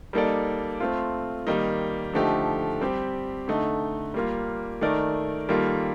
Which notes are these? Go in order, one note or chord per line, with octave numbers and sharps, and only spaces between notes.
G3 A#3 D#4 A4 D5
A3 C4 F4
D#3 G3 A#3 D#4
D3 F3 A3 D#4 G4
G3 C4 G4
D3 A3 D#4
G3 A#3 F4
D#3 A3 D#4 A#4 D5
D#3 G3 A#3 F4 A4